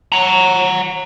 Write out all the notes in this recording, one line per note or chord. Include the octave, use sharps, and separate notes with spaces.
F#5 A#5